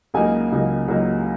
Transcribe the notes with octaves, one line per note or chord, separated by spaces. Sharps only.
C#2 C#3 F#3 A#3 D#4 G#5
C#2 C#3 F#3 A#3 D#4
C#2 C#3 F#3 A#3 D#4